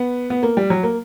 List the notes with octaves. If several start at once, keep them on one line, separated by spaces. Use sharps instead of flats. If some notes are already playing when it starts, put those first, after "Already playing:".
Already playing: B3
B3
A#3
G3
F#3
A#3